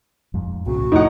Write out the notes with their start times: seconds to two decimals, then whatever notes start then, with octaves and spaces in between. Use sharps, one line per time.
0.34 F2 G#2
0.66 C2 A#2 C#3 F#4
0.92 F2 A2 D#4 F#5